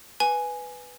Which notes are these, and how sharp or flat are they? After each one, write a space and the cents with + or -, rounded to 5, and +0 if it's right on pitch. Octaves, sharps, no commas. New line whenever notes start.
B4 +0 G#5 +0